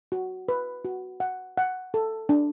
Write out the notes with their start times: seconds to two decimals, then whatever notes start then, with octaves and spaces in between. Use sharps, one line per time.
0.12 F#4
0.49 B4
0.85 F#4
1.20 F#5
1.58 F#5
1.94 A4
2.29 D4